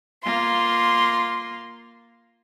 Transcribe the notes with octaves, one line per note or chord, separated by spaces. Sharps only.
A#3 F4 C6